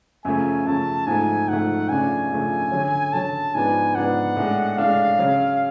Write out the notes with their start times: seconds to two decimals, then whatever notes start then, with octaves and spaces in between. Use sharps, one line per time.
0.25 F#2 C#3 F3 A3 G#5
0.66 F#2 C#3 F3 A3 A5
1.07 G#2 F3 A3 G#5
1.49 G#2 F3 A3 F#5
1.89 F#2 C#3 F3 A3 D4 G#5
2.31 F#2 C#3 F3 A3 D4
2.71 D3 F#3 C#4
3.13 D3 F#3 C#4 A5
3.55 G#2 F3 B3 D4 G#5
3.95 G#2 F3 B3 D4 F#5
4.36 A2 G#3 D4
4.78 A2 G#3 D4 F5
5.19 C#3 F#3 C#4